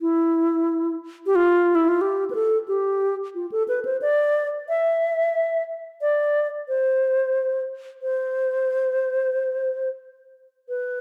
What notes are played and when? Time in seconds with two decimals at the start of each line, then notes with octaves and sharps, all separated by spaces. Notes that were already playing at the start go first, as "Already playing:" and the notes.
0.01 E4
1.26 G4
1.35 F4
1.75 E4
1.88 F4
2.01 G4
2.31 B4
2.35 A4
2.68 G4
3.35 F4
3.52 A4
3.68 B4
3.85 C5
4.02 D5
4.69 E5
6.01 D5
6.68 C5
8.02 C5
10.69 B4